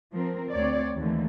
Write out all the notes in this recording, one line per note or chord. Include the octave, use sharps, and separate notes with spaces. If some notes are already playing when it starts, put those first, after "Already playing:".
F3 C4 A#4
D2 C4 C#5 D5
D#2 D3 E3 A3